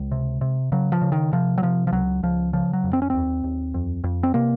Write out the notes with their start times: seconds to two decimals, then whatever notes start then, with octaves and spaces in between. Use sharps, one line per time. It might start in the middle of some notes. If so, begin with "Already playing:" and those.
Already playing: C#2 G#3
0.12 C3
0.41 C3
0.72 C#3 F#3
0.92 F3
1.02 C#3
1.12 D#3
1.33 C3 F3
1.58 F#3
1.62 C3 F3
1.87 F3
1.92 C#2 F#3
2.23 C#2 F3
2.53 C#3 F3
2.73 F#3
2.84 F2
2.93 C4
3.02 C#4
3.10 D#2 C4
3.44 D#2
3.74 F2
4.04 F2
4.23 C4
4.34 C3 A#3